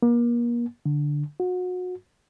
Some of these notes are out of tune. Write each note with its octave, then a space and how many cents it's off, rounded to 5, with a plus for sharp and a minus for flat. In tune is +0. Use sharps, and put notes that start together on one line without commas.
A#3 +35
D3 +0
F#4 -30